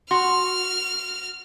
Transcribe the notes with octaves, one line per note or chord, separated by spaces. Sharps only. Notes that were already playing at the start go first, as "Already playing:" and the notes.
F#4 C6 F6